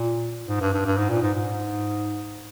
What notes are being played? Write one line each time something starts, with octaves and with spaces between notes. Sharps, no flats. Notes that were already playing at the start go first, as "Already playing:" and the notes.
Already playing: A#2
G#2
G2
G2
G2
G#2
A#2
G#2
G#2